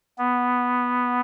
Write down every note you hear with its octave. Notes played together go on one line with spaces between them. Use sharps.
B3